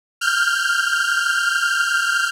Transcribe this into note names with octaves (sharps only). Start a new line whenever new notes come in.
F6 G6